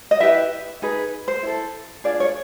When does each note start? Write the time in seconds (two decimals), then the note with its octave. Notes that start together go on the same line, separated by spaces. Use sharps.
0.11 D#5
0.20 E4 G4 B4 E5
0.82 D#4 G#4 B4
1.28 C5
1.43 E4 A4
2.04 D4 F4 G#4 D5
2.20 C#5